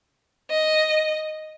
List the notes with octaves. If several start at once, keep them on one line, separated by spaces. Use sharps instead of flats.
D#5